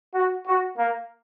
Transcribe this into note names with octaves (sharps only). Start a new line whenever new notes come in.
F#4
F#4
A#3